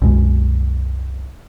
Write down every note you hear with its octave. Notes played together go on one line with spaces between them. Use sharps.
C2 F#2 B2 G#3